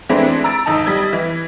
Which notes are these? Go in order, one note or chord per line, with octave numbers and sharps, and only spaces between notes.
E3 G#3 A3 C4 D4 E4
A#5 E6 A6 D7
G#1 D#4 A5
G3 D#5 G#6
E3